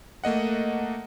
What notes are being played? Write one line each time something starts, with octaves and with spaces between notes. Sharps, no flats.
A3 A#3 D#5 F#5